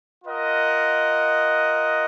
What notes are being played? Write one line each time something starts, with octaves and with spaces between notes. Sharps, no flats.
F4 A#4 D#5 F#5